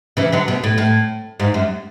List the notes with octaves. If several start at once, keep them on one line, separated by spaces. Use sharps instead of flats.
C#3 E3
D3 F#3
B2
A2
A2
G#2
F#2